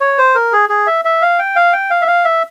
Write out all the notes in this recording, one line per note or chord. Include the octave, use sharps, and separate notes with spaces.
C#5
C5
A#4
G#4
G#4
E5
E5
F5
G5
F5
G5
F5
E5
F5
E5